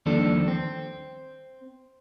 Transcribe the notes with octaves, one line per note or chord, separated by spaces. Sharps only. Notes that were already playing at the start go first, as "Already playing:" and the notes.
D#2 F3 G3 D4 A4
C4